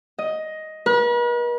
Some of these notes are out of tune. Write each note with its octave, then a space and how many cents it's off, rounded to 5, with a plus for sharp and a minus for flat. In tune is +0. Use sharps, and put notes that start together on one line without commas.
D#5 +10
B4 -45